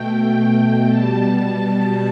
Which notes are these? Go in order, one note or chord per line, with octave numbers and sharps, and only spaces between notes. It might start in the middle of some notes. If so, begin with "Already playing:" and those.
Already playing: B2 A3 G5
B2 G3 A5
A5